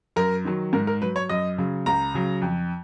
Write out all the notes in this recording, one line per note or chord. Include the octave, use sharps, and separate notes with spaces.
F#2 A#4
D#3 F#3
G#2 A#4
A#4
F#3 B4
C#5
F#2 D#5
C#3 F#3
C#2 A#5
C#3 F#3
F2